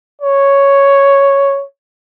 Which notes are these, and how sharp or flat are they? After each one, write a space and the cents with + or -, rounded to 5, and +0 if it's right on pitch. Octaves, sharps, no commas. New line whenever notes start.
C#5 +0